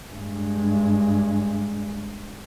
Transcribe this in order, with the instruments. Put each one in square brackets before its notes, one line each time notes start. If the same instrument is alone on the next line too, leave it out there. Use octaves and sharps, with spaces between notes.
[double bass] G2 G#3